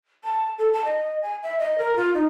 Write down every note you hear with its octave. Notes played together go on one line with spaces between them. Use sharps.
A5
A4
A5
D#5
G#5
E5
D#5
A#4
F4
D#4